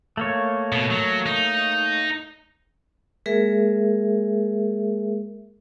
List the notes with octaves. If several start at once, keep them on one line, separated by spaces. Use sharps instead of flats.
A3 A#3 C#5
B2
F#3
D#4
G#3 A#3 G#4 A#4 E5